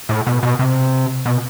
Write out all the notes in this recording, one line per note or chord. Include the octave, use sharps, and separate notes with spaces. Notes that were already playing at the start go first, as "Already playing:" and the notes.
A2
B2
B2
C3
B2